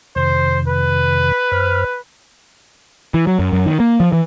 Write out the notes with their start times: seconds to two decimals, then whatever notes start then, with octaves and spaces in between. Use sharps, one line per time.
0.16 F2 C3 D#3 C5
0.68 B4
1.52 F#2 C5 F6
3.14 E3
3.27 F#3
3.39 F#2
3.53 F#2
3.66 D#3
3.80 A#3
4.00 F3
4.12 E3